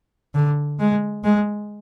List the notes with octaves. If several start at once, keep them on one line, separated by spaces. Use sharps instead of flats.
D3
G#3
G#3